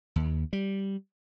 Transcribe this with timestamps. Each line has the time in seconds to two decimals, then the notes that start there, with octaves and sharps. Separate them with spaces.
0.16 D#2
0.53 G3